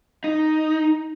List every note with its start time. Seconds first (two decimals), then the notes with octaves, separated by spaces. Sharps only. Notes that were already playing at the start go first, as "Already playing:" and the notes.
0.24 D#4